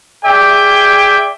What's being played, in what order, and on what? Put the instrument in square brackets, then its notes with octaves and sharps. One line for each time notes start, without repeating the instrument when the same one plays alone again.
[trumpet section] G#4 D5 E5 G5